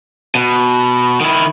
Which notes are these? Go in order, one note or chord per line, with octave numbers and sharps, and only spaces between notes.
B2
D#3 E4